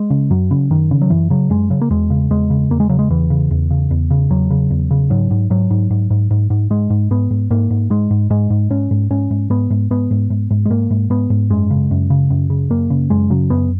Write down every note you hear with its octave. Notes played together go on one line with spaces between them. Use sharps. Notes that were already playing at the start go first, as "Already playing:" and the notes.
Already playing: G#3
C#3
F#2 F#3
C#3
F#2 D#3
C#3
F#3
F#2 E3
C#3 F#3
F#2 G#3
C#3 F#3
A#3
E2 G#3
C#3
E2 G#3
C#3
E2 A#3
G#3
C#3 F#3
G#3
E2 E3
C#3
E2
C#3
E2
C#3
E2 F#3
C#3
E2
C#3
G#2 F#3
G#2
G#2 F#3
G#2
G#2
G#2
G#2
G#2
G#2 G#3
G#2
G#2 B3
G#2
G#2 A#3
G#2
G#2 G#3
G#2
G#2 G#3
G#2
G#2 C#4
G#2
G#2 C#4
G#2
G#2 B3
G#2
G#2 B3
G#2
G#2
G#2
G#3
G#2 A#3
G#2
G#2 B3
G#2
F#2 G#3
C#3
F#2
C#3
F#2
C#3
F#2 A#3
C#3
F#2 G#3
C#3 F#3
F#2 B3